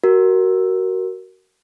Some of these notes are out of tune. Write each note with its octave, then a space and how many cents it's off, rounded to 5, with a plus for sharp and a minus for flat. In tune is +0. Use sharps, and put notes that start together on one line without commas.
F#4 +20 A#4 +0